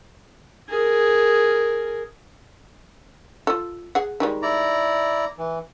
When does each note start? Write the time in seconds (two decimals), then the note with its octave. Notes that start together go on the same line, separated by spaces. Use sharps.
0.70 G#4 A#4
3.47 F4 A4
3.95 G#4 F#5
4.20 D#3 G3 G#3
4.42 E4 D5 A#5
5.38 E3